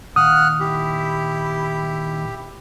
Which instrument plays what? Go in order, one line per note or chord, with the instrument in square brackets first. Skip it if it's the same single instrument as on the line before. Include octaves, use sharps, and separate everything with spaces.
[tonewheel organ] A#2 D#3 [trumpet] F5 [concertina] F#5 F6 F#6 [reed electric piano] D#6
[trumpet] E4 [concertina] G4